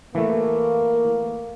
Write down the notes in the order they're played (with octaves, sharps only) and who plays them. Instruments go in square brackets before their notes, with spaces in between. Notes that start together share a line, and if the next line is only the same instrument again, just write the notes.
[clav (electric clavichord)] E3 A3 [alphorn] A#3